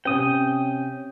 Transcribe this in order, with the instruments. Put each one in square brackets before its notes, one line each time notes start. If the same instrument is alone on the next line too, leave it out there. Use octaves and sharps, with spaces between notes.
[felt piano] C3 C#4 [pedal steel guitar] G5 D#6